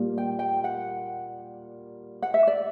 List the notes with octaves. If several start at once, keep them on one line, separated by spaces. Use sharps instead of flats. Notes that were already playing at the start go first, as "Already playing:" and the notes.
Already playing: A#2 G3 A#3
G5
G5
F#5
F#5
E5
D5